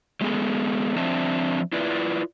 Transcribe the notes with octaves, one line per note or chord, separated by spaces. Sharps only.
F#3 G#3 B3 G#4 A4
F3 C4 D4 E5 A5
E4 F4 B4 D5